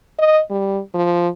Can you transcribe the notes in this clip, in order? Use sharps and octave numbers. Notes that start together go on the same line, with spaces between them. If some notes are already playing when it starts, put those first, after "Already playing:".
D#5
G3
F3